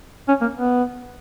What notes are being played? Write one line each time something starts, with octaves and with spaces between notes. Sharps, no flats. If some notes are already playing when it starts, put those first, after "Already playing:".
C#4
A#3
B3